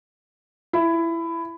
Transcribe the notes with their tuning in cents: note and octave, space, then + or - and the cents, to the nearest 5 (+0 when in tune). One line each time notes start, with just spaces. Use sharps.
E4 +15